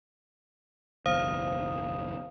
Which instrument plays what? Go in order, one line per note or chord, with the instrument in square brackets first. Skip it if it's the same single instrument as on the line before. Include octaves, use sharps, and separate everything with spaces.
[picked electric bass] F#1 B1 E2 [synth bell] C5 F5 D#6